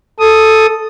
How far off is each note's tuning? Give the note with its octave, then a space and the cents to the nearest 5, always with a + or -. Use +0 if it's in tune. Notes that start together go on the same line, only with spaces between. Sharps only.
A4 +0 D#6 +0